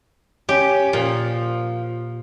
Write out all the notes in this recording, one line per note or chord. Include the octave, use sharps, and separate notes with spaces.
C#4 G4
A#2 F3